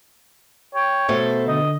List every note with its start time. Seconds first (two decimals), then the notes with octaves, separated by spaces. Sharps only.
0.75 C#5 G5
1.09 B2 A3 A4 C5
1.48 D3 D#5